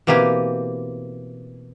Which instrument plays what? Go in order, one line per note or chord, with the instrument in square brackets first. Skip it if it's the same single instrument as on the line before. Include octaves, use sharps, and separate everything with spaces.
[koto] B2 E3 A#3 C4 G4 G#5